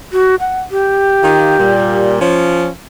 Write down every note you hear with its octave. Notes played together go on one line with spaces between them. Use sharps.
F#4
F#5
G4
D#3 F4
A#2 G3
F3 C#4